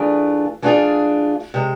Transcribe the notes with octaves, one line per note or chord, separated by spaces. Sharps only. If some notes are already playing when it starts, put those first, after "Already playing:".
Already playing: E3 A3 D4 F4 G#4
E3 A3 D4 F4 G#4
C3 G#3